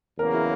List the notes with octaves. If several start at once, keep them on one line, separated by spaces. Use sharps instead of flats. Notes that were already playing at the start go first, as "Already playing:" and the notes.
E2 C#3 F#3 A#3 A#4
E4